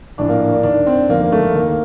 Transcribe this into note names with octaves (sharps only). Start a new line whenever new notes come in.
A#1 A2 D4
A#3
D4
D#2 D#3 D4
C4
G1 F2 D#3 A#3
A3
D#2 D#3 A#3